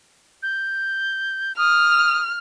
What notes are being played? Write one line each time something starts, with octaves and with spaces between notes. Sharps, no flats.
G6
D#6 F6